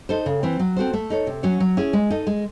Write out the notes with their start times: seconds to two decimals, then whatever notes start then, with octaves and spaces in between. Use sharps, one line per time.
0.09 D#4 A4 C5
0.26 C#3
0.43 E3 C4
0.59 F#3
0.76 C4 F#4 A4 C5
0.93 A3
1.10 D#4 A4 C#5
1.27 C3
1.43 F#3 C#4 F#4 C#5
1.60 F#3
1.77 C#4 E4 G#4
1.93 G#3
2.10 D#4 A4 D#5
2.27 G#3